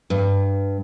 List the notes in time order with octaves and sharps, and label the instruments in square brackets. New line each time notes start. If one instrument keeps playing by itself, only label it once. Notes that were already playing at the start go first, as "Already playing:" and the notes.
[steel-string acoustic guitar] G2